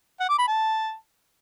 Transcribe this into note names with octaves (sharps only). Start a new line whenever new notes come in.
F#5
D6
B5
A5